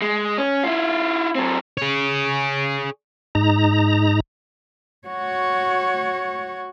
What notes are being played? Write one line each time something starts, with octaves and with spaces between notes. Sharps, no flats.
G#3
C#4
E4 F4
F#3 C4
G#4 C#5
G#2 D#4 A#5
F#4 C#5